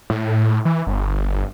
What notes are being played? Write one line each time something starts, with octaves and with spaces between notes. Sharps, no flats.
A2
E3
G1